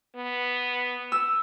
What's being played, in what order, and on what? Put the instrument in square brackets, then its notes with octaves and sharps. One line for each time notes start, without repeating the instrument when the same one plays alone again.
[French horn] B3
[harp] E6